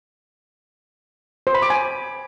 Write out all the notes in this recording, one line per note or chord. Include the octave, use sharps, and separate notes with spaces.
C5
B5
D6
G#5